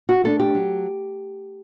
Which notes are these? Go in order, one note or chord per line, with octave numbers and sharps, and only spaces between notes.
F#4
A3 D4 A4
G4
F#3